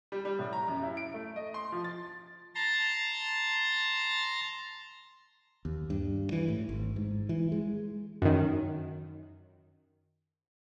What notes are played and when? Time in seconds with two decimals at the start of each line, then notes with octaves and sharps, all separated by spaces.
0.12 G3
0.25 G3
0.39 A2
0.53 A#5
0.68 F#2
0.83 E4
0.97 D7
1.14 A3
1.36 D#5
1.54 C6
1.72 F3
1.84 A6
2.55 A5 A#5 C6 A6
5.65 D#2
5.90 G2
6.32 E3
6.48 A2
6.69 G#1
6.96 G#2
7.29 E3
7.52 G#3
8.22 F#2 D#3